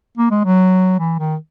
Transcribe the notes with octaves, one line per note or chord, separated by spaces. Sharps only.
A#3
G#3
F#3
E3
D#3